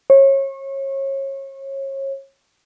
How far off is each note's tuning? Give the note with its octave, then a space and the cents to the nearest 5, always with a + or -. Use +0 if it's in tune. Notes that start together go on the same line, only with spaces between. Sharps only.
C#5 -30